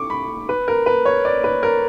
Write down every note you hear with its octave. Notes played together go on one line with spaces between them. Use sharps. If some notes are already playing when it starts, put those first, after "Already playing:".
Already playing: C#6 D6
B5
B4
A#4
B4
C#5
D5
B4
A#4